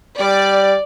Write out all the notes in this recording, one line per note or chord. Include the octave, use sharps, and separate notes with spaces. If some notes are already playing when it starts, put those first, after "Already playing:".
G3 D5